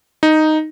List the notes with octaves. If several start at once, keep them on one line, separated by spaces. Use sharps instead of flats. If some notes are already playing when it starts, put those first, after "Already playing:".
D#4